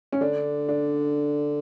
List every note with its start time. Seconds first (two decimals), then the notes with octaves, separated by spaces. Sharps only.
0.13 C#4
0.21 D3 D4
0.69 D4